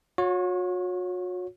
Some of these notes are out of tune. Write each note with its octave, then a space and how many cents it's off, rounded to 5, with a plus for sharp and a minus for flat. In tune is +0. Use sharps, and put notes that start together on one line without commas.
F#4 -40 C#5 +0